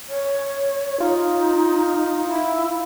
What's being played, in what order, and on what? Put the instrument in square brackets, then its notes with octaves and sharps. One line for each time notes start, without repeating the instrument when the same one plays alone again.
[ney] C#5
[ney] D#4 [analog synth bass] F4
[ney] E4